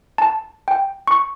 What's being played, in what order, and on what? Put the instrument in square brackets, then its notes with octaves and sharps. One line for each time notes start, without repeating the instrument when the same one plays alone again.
[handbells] A5
G5
C#6